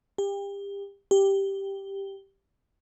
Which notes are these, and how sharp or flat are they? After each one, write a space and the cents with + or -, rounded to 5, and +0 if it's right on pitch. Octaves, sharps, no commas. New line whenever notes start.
G4 +30
G4 +0